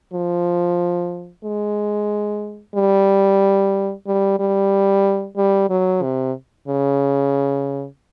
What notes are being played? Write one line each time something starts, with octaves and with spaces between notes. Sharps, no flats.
F3
G#3
G3
G3
G3
G3
F#3
C3
C#3